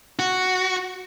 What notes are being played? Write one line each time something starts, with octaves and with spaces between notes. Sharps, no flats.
F#4